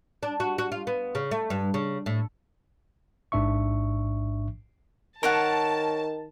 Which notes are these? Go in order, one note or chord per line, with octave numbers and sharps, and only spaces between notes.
D4
F#4
F#4
F4
B3
C#3
A3
G2
C#3
A2
A1 G#2 D4 E5 C#6
D#3 A#4 C#5 F#5 A5